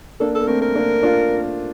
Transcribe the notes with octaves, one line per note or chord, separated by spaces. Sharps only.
A#3 D4 A4
A4
A#3
A3 C4 A#4
A#4
A#3 D4
D4 F4